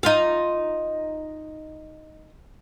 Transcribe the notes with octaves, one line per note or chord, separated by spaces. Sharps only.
D#4 F4 F5